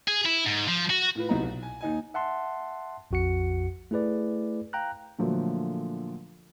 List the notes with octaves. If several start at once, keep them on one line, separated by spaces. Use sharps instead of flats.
G#4
E4
G#2
F3
F#4
A2 F4 B4
C2 F#3 B3 D#4 A#5
B1
G#5
D#2 D#4 G#5
E5 F#5 A5 C6
A#1 F2 F#4 F#5 C#7
A3 E4 G#4 B4 D5
F5 G5 A#5 F#6
A#2 D3 F3 F#3 A3